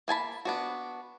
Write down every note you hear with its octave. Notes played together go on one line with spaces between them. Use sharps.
A#3 G#5 A5 B5
B3 D4 F#4